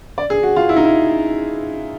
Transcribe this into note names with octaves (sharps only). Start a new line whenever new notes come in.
D5
G#4
F#4
F4
E4
D#4
E4